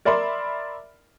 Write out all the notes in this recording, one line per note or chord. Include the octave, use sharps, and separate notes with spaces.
A#4 D5 E5 B5 C6